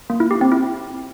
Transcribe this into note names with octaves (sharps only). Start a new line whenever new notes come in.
A#3
E4
G4
C4
E4